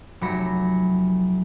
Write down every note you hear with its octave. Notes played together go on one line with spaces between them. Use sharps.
F1 F#3 B5 A#6 C#7